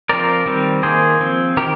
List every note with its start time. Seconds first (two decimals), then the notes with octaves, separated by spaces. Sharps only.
0.09 F3 C4 A#4 D5
0.46 D#3 G3 C4
0.83 D#3 A#3 G#4 C5
1.21 F3 C4
1.57 D#3 G4 A#4